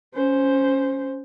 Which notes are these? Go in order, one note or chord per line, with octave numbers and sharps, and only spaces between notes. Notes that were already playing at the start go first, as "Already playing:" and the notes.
C#4 C5